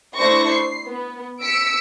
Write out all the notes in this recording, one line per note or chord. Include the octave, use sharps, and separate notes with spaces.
A3 D4 E4 C5 C#6 A#6
C7
B3
E6 B6 C#7 D7